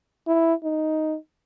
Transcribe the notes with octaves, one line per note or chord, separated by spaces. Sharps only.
E4
D#4